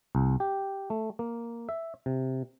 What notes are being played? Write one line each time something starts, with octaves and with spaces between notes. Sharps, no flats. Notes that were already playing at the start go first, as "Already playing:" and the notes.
C2
G4
A3
A#3
E5
C3